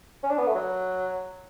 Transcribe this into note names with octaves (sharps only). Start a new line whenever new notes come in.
C#4
D4
B3
A3
F#3